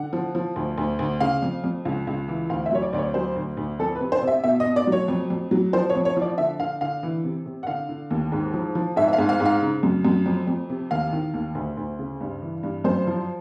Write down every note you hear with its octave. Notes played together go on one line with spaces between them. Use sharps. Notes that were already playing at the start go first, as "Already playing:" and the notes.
Already playing: D3 F#5
F3
F3
D2
D2
D2
C#3 F5
F2
F2
C#2
C#2
E3
D2 F5
E5
F#3 C#5
D5
D2 D5
C#5
F#3 C5
D2
D2
F2 A4
B4
C3
C5
C3
E5
B2 E5
D#5
B2
D5
F#3
C#5
F2
F2
F#3
F3 C5
C#5
F2
C#5
F3
D5
D3 E5
D3 F5
D3 F5
E3
C3
C3
F#5
D3 F5
D3
D#2
G#2
F3
F3
G#2 E5
E5
F5
G#2
F5
G#2
F5
C#3
F#2
F#2
F2
F2
C3
D#2 F5
D#3
D#2
D2
D2
C#3
G2
E3
G2
F#2 C5
F3